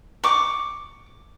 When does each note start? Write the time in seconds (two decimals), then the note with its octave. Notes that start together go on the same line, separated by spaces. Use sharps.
0.24 C#6 D6